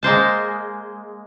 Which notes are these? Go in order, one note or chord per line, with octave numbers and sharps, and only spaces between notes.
G#3 A#3 C5 A5